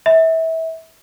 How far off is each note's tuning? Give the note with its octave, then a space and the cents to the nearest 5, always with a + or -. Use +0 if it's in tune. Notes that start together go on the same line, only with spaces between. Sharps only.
E5 -25